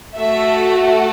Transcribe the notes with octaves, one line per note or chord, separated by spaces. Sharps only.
A3 F#4 A4 E5